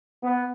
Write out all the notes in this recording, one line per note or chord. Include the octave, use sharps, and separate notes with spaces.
B3